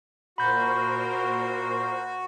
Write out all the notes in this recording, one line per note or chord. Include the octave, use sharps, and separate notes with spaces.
A#2 F#4 A#4 C5 B5 G6